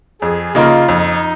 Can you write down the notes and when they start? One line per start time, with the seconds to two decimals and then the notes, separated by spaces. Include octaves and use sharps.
0.22 F2 G#4
0.55 C#3 A#3 D#4 F4 A#4
0.88 F2 D#4